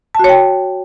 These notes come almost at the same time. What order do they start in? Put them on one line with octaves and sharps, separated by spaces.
A5 F#4 C#5 G5